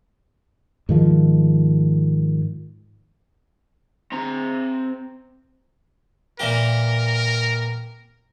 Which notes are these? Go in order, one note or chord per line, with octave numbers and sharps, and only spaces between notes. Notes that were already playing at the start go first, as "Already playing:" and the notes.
G#2 D#3 F3
C4 A#5
A#2 E3 G4 A#4